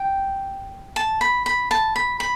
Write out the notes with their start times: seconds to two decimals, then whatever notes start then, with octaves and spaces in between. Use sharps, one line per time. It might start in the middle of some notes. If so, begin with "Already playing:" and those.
Already playing: G5
0.96 A5
1.21 B5
1.46 B5
1.71 A5
1.96 B5
2.20 B5